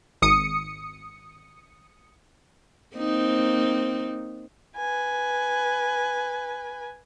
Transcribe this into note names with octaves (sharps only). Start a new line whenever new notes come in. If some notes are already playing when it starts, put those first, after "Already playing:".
G#1 D#6 C#7
A#3 C4 D#4
B4 G#5